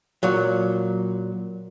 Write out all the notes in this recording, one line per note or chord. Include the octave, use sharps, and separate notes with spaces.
A#2 F#3